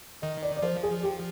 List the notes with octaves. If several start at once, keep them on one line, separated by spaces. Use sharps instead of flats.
D#3 D#5
D5
D5
F3 C5
G#4
G4